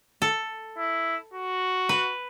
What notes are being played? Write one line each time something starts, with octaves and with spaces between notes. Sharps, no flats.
A4
E4
F#4
B4